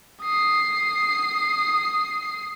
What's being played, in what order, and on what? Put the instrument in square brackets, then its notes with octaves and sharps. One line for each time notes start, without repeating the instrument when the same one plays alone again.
[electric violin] D#6 C7